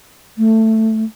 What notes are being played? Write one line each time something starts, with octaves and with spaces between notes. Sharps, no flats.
A3